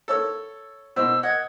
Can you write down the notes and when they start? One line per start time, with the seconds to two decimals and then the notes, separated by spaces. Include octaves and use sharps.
0.08 A4 C#5 E6
0.96 B2 C5 E6
1.23 D#5 F#5 G#6